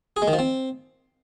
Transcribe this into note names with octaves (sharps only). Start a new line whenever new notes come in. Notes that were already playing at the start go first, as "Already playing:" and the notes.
G#4
G#3
D#3
F3
C4